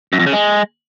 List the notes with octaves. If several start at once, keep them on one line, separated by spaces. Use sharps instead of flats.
F#2
F2
C#3
G#3